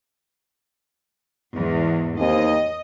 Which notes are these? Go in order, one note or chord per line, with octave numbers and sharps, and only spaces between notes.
E2 G#2
D#2 C4 D#5